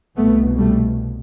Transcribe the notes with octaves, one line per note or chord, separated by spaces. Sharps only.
C2 B2 A3 B3
G3 A3